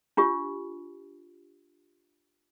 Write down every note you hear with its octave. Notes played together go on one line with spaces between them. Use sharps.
D4 F4 G4